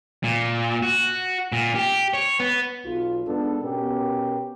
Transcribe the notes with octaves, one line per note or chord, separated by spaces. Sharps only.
A#2
F#4
A#2
G4
C#5
B3
B1 F4
G#2 B3 D4 A4
B2 B3 C#4 G4 A#4